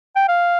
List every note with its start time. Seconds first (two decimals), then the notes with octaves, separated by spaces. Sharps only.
0.16 G5
0.29 F5